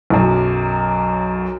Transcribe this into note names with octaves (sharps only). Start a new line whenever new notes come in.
B1 F#2